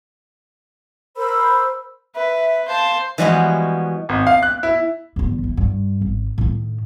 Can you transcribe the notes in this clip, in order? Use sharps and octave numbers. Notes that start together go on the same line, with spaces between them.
A#4 C5 B5 E6
B4 E5
C5 F5 A5
E3 F3 G3 G#3 B3 F#4
G#1
F5
F#6
E4
G1 E2
E3
G2
G#1
A2 D#3